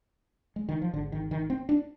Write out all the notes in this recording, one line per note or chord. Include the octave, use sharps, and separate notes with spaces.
G#3
D#3
F3
G#1 G#2 D3
D#3
D#3
C4
D4